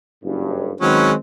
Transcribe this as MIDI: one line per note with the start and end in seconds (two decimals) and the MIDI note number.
0.24 0.72 30
0.24 0.72 43
0.81 1.14 51
0.81 1.12 54
0.81 1.14 56
0.81 1.14 60
0.81 1.12 61
0.81 1.12 71